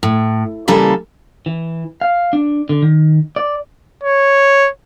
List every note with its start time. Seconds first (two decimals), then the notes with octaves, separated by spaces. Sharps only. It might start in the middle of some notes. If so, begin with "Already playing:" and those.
0.03 A2
0.68 C#3 E3 G3 A#3 A4
1.46 E3
2.01 F5
2.33 D4
2.69 D3
2.82 D#3
3.36 D5
4.04 C#5